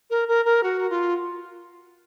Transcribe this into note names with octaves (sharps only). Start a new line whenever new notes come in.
A#4
A#4
A#4
F#4
F4